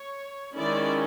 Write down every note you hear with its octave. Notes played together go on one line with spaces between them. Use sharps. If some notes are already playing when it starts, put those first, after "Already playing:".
Already playing: C#5
D#3 G#3 C#4 E4 D5